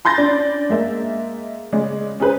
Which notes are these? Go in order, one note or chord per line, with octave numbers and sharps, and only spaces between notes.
B5 C6 G6 A6 A#6
C#4 D4
G#3 A#3 E5
C#3 G#3 C#4 D5
C#4 G#4 B4 C5